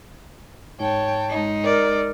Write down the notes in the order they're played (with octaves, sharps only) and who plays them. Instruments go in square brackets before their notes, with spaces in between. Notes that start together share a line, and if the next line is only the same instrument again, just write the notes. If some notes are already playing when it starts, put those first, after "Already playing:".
[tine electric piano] G#2 [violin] C#5 [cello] G5 [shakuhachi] A5
[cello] G#3 D#4
[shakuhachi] A#4 [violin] D5